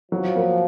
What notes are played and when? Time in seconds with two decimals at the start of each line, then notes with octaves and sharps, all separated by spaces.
0.12 F3 F#3
0.35 A#3